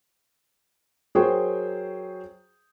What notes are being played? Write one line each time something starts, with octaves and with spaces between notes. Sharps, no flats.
F#3 G#4 A#4 C5 G5 C#6